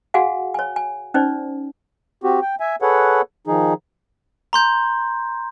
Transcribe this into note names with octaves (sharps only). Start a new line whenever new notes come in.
F#4 G#4 F5 F#5 G#5
C#5 G#5
G#5
C#4 D#4 C5 D5
C4 F#4 G4
G5
E5 G#5
G#4 A4 B4 C#5 F#5
D#3 F3 D#4 G#4
A#5 C6 G6